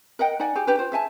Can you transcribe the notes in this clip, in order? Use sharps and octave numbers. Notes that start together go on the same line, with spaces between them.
A#4 D#5 F#5 G5
D#4 D5 F#5 G#5
G4 G#4 G#5
D4 G4 B4
F4 C5
G#4 E5 G#5 A5